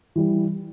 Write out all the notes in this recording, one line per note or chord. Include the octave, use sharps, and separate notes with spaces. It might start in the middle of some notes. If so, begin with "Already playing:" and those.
E3 G3